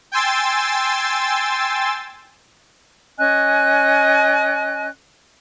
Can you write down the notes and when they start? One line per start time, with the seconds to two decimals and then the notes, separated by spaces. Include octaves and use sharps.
0.12 G5 G#5 C6 E6 A6
3.18 C#4 D#5 G#5 F#6